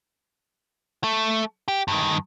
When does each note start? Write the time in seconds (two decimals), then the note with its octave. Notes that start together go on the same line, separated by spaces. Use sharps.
1.04 A3
1.68 G4
1.88 G2 D#3